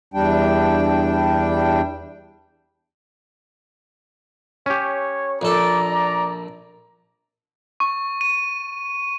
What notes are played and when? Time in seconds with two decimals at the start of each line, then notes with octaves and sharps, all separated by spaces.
0.14 E2 G3 D4 G5
4.66 C#4 G4 C#5
5.41 A#1 A4 D5 A#5
5.90 D5
7.80 C#6
8.21 D#7